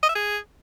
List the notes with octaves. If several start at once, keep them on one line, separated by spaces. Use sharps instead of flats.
D#5
E5
G#4